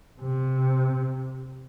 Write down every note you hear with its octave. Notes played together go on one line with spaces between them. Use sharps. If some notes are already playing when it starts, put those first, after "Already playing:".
C3